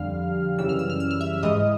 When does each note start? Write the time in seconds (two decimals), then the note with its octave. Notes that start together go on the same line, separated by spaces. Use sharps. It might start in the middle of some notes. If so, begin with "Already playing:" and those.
Already playing: F2 D3 G3 F5 F6
0.58 F#2 C#3 E3 G3 E6
0.69 F6
0.79 E6
0.90 F6
1.00 E6
1.11 F6
1.21 E5 E6
1.43 G#2 E3 G#3 D#5 D#6